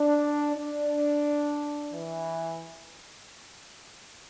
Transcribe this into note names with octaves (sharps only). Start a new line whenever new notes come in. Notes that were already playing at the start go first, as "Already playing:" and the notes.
Already playing: D4
D4
E3